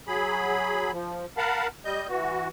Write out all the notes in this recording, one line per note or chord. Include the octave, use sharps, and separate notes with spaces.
F#3 G#4 B5
F3
A#4 F5 F#5 A5 B5
G3 D#5 G6
E3 F#4